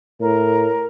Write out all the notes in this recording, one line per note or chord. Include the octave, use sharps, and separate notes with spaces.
A2 A#4